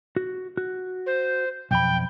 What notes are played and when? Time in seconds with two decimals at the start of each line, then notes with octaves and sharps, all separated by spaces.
0.16 F#4
0.57 F#4
1.06 C5
1.71 B1 F2 G5 B5